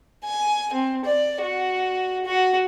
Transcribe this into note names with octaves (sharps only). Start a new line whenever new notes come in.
G#5
C4
D5
F#4
F#4